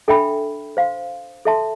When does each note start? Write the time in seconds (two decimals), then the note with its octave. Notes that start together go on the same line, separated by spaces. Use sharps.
0.08 D4 A4 E5 G5 B5
0.77 C5 F5 C6
1.45 A4 E5 A5 C6